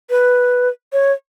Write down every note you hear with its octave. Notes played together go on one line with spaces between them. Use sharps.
B4
C#5